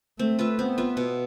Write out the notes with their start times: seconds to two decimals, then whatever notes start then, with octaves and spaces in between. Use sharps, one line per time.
0.19 A3 C4
0.39 F4 B4 E5
0.59 B3 C4
0.78 F4 B4 E5
0.97 B2